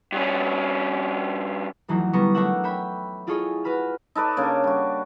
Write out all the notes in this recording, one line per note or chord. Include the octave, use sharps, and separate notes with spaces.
G2 C#4
F2 E3 F#3 A3 D#4
D3 G3 B3 A#5 C#6
A3 D4 A#4 C#5 E5 F#5
C#5 E5 G5 B5
E4 F4 G#4 A4 C#5 D#5
F#4 B4 B5 F6
D#4 A4 B4 D5
C#3 A#3 D4
G3 F#4